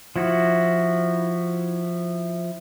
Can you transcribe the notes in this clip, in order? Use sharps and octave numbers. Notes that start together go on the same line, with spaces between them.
F3 E4 F#4